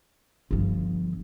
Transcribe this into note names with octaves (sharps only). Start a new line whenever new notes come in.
G1 F3